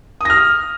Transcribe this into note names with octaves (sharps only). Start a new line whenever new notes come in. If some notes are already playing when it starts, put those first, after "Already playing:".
D#6 F6 A#6